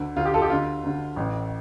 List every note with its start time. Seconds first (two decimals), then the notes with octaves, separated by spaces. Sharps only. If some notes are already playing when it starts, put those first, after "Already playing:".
Already playing: D2 D3
0.16 D2 D3 F4
0.25 G4
0.34 F4 A4
0.42 G4
0.50 D2 D3 F4
0.84 D2 D3
1.16 A1 A2